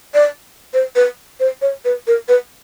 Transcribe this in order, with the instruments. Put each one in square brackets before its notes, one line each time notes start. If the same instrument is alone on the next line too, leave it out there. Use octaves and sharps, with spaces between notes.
[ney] D5
C5
B4
C5
C#5
B4
A#4
B4